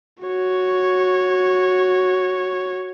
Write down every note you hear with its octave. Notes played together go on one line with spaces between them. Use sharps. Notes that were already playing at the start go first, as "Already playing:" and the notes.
F#4 C#5